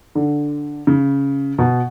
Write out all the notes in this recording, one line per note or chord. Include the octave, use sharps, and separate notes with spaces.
D3
C#3
B2